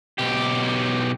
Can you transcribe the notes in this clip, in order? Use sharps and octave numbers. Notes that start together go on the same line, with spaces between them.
B1 G4